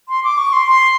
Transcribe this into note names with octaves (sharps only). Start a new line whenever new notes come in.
C6
D6
C#6
C6
C6